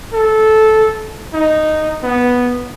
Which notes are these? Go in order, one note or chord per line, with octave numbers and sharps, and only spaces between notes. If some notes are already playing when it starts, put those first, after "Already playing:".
A4
D#4
B3